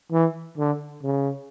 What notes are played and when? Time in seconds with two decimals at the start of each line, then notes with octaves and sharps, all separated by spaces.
0.12 E3
0.58 D3
1.03 C#3